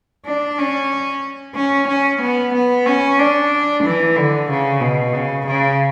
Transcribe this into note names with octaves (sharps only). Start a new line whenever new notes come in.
D4
C#4
C#4
C#4
B3
B3
C#4
D4
E3
D3
C#3
B2
C#3
C#3